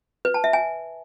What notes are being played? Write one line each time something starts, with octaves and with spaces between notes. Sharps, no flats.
B4
A5
E5
G#5